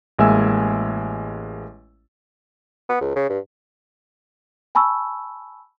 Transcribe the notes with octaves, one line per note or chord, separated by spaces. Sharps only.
A1 G#3 A#3 E5 G#5 E6
B3
C#2
C#3
G2
G#5 A5 B5 C#6 E6